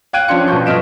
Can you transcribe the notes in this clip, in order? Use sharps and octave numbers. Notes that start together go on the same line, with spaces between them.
F5 G5 F#6 G#6 D7 D#7
F3 C#4 D4 C6 C#7
B2 F3 F#3 C#6 G6
G1 D#5 F6 B6 D7 E7